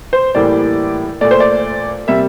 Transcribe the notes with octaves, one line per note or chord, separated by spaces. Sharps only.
C5
A2 E3 G3 A#3 D5
A#2 A3 D5
C5
D5
C3 G3 A#3 E5